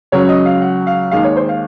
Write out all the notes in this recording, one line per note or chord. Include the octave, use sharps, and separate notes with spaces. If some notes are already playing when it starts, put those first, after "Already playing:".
C#2 C#3 F#3 C#5
D#5
F5
F#5
F5
D#2 D#3 G#3 F5
C#5
C5
F5